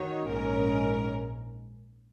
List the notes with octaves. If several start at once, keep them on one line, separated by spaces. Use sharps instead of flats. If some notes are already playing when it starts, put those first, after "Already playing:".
Already playing: D#3 D#4 F#4 C#5
A#1 G#2 G#3 C#4 A#4